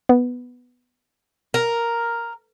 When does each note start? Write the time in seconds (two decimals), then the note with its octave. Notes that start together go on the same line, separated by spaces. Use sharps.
0.09 B3
1.54 A#4